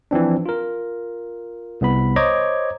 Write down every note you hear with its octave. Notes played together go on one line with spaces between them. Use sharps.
E3 F3 C4 D4
F4 A#4
C2 B3 B5
C5 C#5 D#5 A#5 D6 G#6